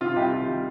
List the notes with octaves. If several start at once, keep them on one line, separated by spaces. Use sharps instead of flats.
C3 F4
C2 D#4 G4
C2 F4
G3